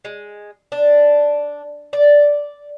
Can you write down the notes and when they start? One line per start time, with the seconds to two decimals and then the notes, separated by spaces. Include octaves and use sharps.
0.05 G#3
0.72 D4
1.93 D5